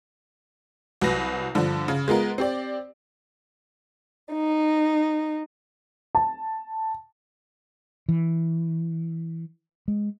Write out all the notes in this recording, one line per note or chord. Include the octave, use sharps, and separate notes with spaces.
C2 F#3 B4 A#6
G2 D3 F3
C#3
G#3 B3 F4 A#4
C4 G4 D5
D#4
A5
E3
G#3